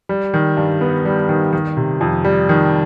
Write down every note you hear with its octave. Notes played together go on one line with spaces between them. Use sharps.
G3
D#3
G2
B3
G3
D#3
D#3
C3
F2
G3
D#3